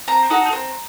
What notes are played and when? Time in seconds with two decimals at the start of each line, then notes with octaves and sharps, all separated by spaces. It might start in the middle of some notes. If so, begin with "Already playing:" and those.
0.08 C4 A#5
0.30 D#4 F#4 A4
0.53 C4